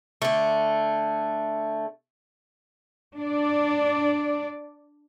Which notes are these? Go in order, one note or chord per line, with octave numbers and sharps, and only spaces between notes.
D3 A3
D4 D5